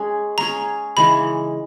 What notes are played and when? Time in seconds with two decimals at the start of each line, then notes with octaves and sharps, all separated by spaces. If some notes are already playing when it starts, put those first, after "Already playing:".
Already playing: G#3 C#4 G#4
0.38 G#3 C#4 G#4 A#5
0.97 C#3 E3 G#3 D#4 B5